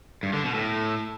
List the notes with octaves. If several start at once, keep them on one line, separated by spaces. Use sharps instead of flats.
G2
D3
B2
A2